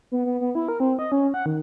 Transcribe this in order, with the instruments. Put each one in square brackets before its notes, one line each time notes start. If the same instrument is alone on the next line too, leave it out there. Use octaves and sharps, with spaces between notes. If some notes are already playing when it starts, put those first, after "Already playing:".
[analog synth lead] B3
B3
B3
E4
A#4
C4
D#5
C#4
F#5
D#3